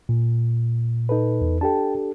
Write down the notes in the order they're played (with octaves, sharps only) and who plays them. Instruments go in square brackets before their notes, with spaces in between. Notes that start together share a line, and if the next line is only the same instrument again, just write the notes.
[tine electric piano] A#2
[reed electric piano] D#4 A4 B4
[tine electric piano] E2
[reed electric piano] D4 G4 A4 [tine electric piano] G5 A5